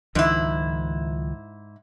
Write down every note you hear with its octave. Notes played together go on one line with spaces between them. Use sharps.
C#2 G#2 D#3 F3 E4